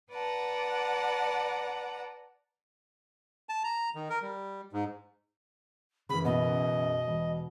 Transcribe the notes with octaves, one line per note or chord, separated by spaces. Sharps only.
B4 D5 F#5 A5 A#5
A5
A#5
D#3
A#4
G3
G#2
F#2 C#3 E3 B5
B2 D#5
E1